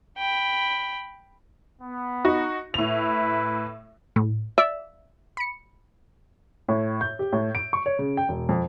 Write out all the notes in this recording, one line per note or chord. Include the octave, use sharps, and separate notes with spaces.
G5 B5
B3
D#4 F#4
A2 E4 B4 F7
A2
D5 E5
B5 C#7
A2
G6
G4
A2
D7
C#6
C#5
C#3
G5
E1
F2